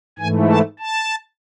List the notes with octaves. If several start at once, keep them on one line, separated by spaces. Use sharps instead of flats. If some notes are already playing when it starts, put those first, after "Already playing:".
G#2 E3 A3 G#5
A5
A5